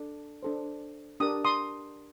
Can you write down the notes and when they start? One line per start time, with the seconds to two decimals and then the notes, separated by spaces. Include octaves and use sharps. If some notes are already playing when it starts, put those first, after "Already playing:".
Already playing: D4 A4
0.43 D4 A4 C5
1.20 D4 G4 A#4 D#6
1.45 C6 D#6